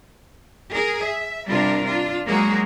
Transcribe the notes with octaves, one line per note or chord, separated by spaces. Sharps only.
G#4 A#4
E5
C3 G3 D4 F4 A#4
D4 F4
F#3 G#3 A#3 F#4 G#4 A#4